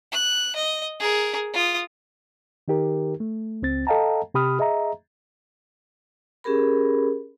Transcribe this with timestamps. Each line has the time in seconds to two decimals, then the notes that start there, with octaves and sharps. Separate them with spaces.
0.12 F#6
0.56 D#5
1.00 G#4 A#4
1.54 F4 D#6
2.68 D#3 D#4 G4 A#4
3.20 A3
3.62 C#2 C4 A6
3.87 A4 D#5 F5 G5 A5 A#5
4.34 C3 G4 B5 D#6 F6
4.59 G#4 D#5 E5 A#5
6.44 C#4 G4 G#4 A#4 B5